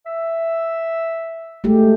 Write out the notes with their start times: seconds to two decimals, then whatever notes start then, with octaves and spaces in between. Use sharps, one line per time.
0.06 E5
1.64 G#3 A3 G4